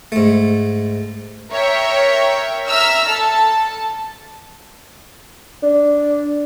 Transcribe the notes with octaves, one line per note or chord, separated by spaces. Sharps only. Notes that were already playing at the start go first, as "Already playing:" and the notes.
G#2 A3
A#4 C#5 E5 G5
E5 A#5 E6 F6
A4 A5
D4